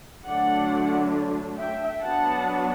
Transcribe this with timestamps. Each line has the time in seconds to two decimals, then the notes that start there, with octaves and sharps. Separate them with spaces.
0.25 D3 F#3 A3 D4 D5 F#5
1.58 E5 G5
2.03 F#3 B3 D4 F#5 A5